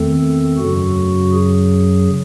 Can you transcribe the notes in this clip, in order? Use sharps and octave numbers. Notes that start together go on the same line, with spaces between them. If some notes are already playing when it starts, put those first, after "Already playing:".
Already playing: E2 D#3 A3 C4 A4
F#2 C#3 F#3 F#4
G#4